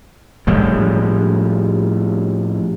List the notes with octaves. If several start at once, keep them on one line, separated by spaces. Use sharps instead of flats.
A2 F3 G3 G#3